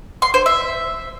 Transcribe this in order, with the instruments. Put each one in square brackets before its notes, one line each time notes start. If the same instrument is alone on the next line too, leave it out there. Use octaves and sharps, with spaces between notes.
[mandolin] C6
C5
E5